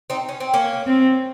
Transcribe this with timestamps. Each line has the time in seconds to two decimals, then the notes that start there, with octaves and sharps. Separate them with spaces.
0.10 C4 D#4
0.29 C#4
0.40 C4
0.54 A#3 C#4
0.86 C4